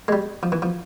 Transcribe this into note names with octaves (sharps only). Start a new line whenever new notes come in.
G#3
G3
F3
E3
F3